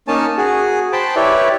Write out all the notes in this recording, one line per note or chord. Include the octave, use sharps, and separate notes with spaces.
A#3 C#4 D#4 C#5 G#5 A5
F#4 G#4
C5 G5 A5 B5
E4 G4 B4 C#5 D5 E5